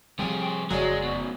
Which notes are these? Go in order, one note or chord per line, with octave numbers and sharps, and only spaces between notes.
C3 F3 G3 G#4 G5
F#1 F2 F#3 G#3 G#4 D5
F#2 B2